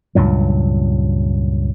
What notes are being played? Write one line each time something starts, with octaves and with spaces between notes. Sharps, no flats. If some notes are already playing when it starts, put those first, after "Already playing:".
C#2 G2 A#2 F#3